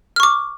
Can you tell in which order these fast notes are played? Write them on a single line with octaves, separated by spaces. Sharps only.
F6 C#6 D6